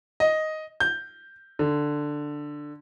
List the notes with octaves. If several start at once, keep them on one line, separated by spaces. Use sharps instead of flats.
D#5
G6
D3